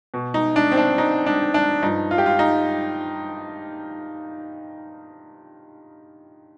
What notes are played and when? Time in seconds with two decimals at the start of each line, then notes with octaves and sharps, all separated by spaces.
0.14 B2
0.34 D#4
0.56 D4
0.72 C4
0.77 D4
0.98 D#4
1.26 D4
1.54 D4
1.82 G2 F3 D#4
2.11 F4
2.18 G4
2.26 F4
2.39 D#4